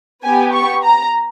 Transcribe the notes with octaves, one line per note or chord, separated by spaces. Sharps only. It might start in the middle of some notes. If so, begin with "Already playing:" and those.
B3 G4 G#5
C#6
A#5